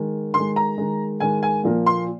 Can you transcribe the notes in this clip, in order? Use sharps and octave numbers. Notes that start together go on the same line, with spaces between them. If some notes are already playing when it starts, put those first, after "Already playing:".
Already playing: D#3 G#3
D#3 C6
G#3
A#5
D#3 G#3
D#3 G#3 G#5
G#5
A#2 F3 A#3
C6